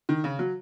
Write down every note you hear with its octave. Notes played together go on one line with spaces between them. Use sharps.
D#3
C#3
F#3